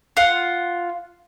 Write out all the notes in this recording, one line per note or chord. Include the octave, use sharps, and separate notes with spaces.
F4 F#5